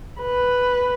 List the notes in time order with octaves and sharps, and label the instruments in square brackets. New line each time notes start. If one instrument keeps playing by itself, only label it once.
[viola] B4